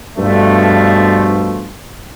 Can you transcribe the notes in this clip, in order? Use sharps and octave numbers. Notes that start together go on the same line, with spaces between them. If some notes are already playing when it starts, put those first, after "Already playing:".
G2 B2 F3 A3